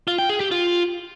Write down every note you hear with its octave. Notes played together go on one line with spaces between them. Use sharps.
F4
G5
G#4
G4
F4